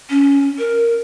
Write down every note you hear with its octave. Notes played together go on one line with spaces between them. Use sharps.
C#4
A#4